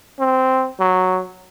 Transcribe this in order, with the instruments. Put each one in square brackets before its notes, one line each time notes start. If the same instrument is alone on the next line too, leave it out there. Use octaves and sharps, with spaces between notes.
[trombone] C4
F#3